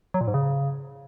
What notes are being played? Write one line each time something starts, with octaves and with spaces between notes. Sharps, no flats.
F#3
A#2
G#2
C#3